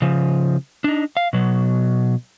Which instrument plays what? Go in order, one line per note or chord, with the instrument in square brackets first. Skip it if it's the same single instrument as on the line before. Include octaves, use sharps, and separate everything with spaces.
[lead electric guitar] C#3 F3
D4 D#4
F5
B2 F#3